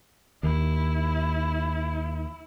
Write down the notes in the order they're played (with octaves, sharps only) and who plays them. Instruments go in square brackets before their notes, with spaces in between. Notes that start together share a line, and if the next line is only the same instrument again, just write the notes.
[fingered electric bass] D#2 [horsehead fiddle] E4